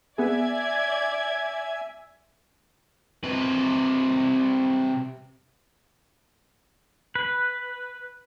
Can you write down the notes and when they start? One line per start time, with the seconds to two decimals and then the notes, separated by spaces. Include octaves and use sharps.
0.18 B3 G#4 D5 E5 G#5 G#6
3.23 C3 B4
7.15 B4